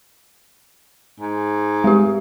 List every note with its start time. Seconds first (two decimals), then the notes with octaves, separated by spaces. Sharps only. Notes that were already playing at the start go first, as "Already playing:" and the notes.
1.20 G#2
1.84 G#3 G4